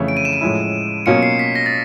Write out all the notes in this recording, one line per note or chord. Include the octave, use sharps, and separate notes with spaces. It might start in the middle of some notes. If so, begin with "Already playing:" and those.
Already playing: F2 C#3 E3 A3 C#4
D7
D#7
E7
D#7
A2 F3 G#3 C#4 E4
B2 F#3 A#3 C#4 F4 C#7
C7
B6
A#6
A6